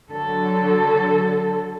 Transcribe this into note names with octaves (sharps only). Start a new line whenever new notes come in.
D3 F#3 A4